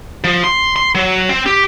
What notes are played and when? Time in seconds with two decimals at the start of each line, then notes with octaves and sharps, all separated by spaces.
0.24 F3
0.44 C6
0.76 C6
0.95 F#3
1.29 C4
1.46 G4